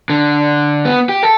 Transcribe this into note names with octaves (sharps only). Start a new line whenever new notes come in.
D3
B3
G4
A4